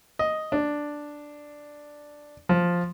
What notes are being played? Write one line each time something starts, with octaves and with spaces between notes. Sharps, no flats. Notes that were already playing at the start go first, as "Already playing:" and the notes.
D#5
D4
F3